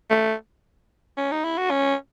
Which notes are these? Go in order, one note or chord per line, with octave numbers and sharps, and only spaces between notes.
A3
C#4
D#4
E4
F#4
C#4